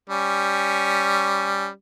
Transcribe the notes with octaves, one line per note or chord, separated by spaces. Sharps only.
G3 C#4